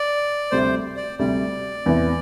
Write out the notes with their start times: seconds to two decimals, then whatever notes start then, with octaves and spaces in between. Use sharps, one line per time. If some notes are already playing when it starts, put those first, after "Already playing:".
Already playing: D5
0.51 D2 C3 G3 C5
0.97 D5
1.19 D2 C3 G3 D5
1.86 E2 C3 E3